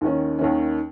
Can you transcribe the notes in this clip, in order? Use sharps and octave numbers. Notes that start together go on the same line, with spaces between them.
D#2 D#3 C#4
D#2 D#3 C#4